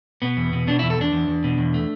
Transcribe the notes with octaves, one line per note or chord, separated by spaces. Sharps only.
B2 B3
E2
B2
B2 D4
E2 E4
A4
E2 D4
E2
E2
B2
E2
A3